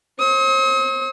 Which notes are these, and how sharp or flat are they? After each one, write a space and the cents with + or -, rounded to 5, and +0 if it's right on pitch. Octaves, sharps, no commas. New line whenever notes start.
C5 +40 D#6 +45